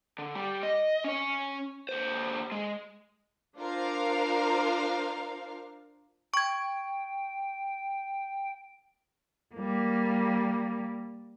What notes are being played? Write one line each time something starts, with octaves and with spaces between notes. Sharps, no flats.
D3
G3
D#5
C#4 C#5
D#2 C5
G#3
D4 F4 A#4 C5 F5
G5 C#6 G#6
G3 A#3